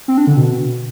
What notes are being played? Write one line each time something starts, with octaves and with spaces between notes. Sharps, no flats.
C4
D4
D3
B2